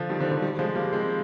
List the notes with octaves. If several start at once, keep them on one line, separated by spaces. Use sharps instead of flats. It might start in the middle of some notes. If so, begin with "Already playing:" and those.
Already playing: D3 F3
D#3 G3
D3 F3
D3 F3
D#3 G3
F3 G#3
G3 A#3
G#3 C4